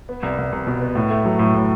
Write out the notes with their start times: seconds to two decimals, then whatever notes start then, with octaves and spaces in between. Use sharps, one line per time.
0.09 B3
0.23 C2
0.38 C2
0.52 C2
0.67 B2
0.81 B3
0.95 A2
1.10 A3
1.25 F#3
1.39 A2
1.54 A2